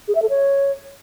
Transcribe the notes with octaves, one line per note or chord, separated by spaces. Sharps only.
G#4
E5
A4
C#5